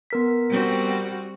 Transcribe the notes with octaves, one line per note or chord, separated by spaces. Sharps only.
B3 A#4 B6
G3 C4 F#4